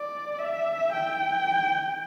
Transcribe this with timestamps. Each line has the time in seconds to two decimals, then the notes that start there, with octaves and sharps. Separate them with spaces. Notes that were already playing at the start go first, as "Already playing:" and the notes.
Already playing: D5
0.38 E5
0.93 G5